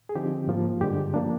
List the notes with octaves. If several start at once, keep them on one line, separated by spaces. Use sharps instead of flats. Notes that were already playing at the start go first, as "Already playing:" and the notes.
G#4
D3 F3 C4 D#4 G4
G#2 F3 A#3 F4
G2 D3 G#3 G4
F3 A#3 D4